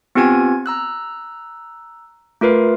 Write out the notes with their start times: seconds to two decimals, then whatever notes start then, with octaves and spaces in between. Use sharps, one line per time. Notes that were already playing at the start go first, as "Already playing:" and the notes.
0.15 B3 C4 F4 G4 G#5 G#6
0.66 A#5 E6 F#6
2.41 A3 F4 A#4 B4